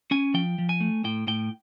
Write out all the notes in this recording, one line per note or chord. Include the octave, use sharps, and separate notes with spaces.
C#4 G#5
F3 G5
F3
G#5
A3
A2 G5
A2 G5